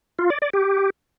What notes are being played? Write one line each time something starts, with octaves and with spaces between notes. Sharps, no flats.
F4
D5
D5
G4